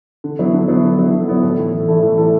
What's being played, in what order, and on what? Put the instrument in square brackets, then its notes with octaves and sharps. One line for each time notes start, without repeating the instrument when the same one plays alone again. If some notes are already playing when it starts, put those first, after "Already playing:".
[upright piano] D3
F#3 B3 E4
D3
F#3 B3 E4
D3
F#3 B3 E4
D3
F#3 B3 E4
A2
E3 A3 E4 A4
A2
E3 A3 E4 A4
A2
E3 A3 E4 A4